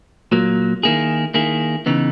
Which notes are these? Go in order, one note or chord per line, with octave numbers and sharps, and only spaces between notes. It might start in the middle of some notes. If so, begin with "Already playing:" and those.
A#2 F#3 A#3
D#3 A#3 E4 G#4
D#3 A#3 E4 G#4
C#3 E3 B3 D#4